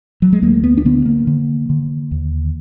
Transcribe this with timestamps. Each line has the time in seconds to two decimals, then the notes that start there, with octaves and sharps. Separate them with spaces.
0.22 F#3
0.33 G#3
0.42 D2 A#3
0.64 B3
0.77 D4
0.85 D3 B3
1.06 A#3
1.27 D3
1.69 D3
2.11 D#2